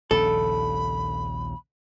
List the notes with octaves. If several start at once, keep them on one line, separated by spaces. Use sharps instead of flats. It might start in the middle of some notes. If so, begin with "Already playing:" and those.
A#1 D#2 C#3 A4 B5